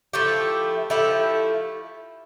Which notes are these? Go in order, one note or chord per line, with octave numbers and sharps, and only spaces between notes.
F3 A3 E4 G4
F3 A3 E4 G4